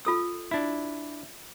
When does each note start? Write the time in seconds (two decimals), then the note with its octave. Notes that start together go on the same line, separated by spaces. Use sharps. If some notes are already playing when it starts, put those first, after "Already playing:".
0.05 F4 A4 E6
0.51 D4 E4